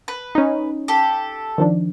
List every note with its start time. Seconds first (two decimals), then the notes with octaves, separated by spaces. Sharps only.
0.08 B4
0.35 C#4 D#4
0.88 G4 A4
1.58 D#3 F3 D4